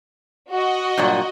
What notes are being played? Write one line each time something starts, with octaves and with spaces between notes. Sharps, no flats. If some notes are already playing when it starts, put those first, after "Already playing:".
F#4 D#5
G2 A#2 F#3